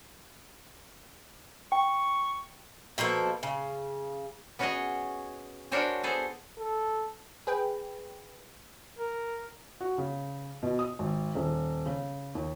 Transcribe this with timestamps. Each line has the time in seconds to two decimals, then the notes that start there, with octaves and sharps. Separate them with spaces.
1.72 G5 C#6
2.98 B2 F3 A#3 A4
3.43 C#3
4.59 B3 C#4 F#4 G#4 C#5 D#5
5.72 D4 F#4 A#4 C5 C#5 G#5
6.03 B3 G#4 A4 C5
6.58 A4
7.47 G#4 B4 G5
8.99 A#4
9.81 F#4
9.98 C#3
10.63 B2
10.79 D#6
10.99 G#1
11.35 D#1
11.86 C#3
12.35 D#2